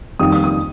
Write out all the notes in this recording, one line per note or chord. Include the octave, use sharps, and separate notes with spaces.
F2 D#3 G3 A#3 D#6
D#6
D#6